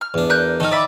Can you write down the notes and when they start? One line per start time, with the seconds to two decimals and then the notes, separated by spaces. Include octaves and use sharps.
0.01 F6
0.14 E2 D4
0.30 A#4 F#6 G6
0.60 D#3 D#4 A4 F6
0.71 D5 E5 B5